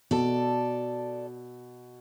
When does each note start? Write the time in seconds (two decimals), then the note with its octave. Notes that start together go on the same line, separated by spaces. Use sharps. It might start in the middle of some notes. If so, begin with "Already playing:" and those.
0.11 B2 A4 D5